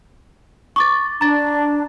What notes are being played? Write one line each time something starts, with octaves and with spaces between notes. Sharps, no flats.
C#6 D6 A6
D4 A#5 A6